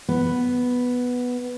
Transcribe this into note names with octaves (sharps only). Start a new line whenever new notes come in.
B3